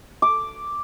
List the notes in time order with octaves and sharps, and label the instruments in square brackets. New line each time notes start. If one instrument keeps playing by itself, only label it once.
[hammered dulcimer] D6